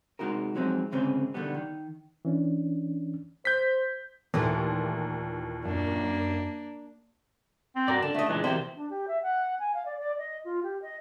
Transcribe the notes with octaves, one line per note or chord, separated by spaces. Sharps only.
C3 G#3 D#4 F#4 A#4
F3 F#3 G#3 C4 D#4
D2 G#2 C#3 G#3 C4 B4
B2 D3 D#3 G3 B3
D#3
E3 C#4 D4
C5 G6 B6
D#2 A#2 E3 A3
F#2 A#3 D4
C4
G2 F#4 A#4 D5
C#2 D3 D4
C#3 A3 D#5
A#2 E3 G#3 D4
B1 E2 C3 D#3 E4 C5
D4
G4
E5
F#5
G#5
F5
D5
D5
D#5
F4
G4
D#5